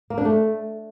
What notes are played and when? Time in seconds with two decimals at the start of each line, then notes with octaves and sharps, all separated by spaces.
0.10 A#3
0.18 D4
0.25 A3